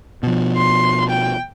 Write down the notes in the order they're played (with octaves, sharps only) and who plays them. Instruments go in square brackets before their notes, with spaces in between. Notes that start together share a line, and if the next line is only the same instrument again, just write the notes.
[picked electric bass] B2 F3
[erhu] C6
G5